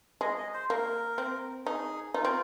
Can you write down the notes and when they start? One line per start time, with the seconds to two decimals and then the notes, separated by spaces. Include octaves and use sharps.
0.21 G#3 D#5
0.37 D#5
0.54 C5
0.70 A#3 A#4
1.18 C4
1.66 D#4 G#4
2.14 D#4 F4
2.25 C4